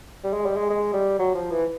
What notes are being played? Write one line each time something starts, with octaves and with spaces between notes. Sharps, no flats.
G3
G#3
G3
G#3
G#3
G3
F#3
F3
E3